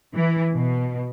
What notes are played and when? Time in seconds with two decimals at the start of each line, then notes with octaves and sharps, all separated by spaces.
0.15 E3
0.55 B2